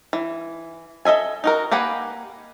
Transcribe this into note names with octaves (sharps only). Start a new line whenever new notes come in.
E3
A4 D#5 E5 G#5
D#4 F#4 A#4
A#3 G4 B4 F#5 G#5